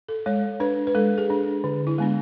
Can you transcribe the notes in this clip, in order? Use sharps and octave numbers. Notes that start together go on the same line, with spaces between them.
A4
G#3 C#5
D4 B4
B4
G#3 A4
G#4
D4
D3
E4
G#3 B3 D4